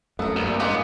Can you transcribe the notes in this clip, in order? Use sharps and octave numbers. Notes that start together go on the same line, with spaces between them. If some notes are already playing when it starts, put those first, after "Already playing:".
F#2 A3 B3 A#4 E6
C2 G2 G3 A#3
A1 G#3 A#3 B3 G4 A#4 C6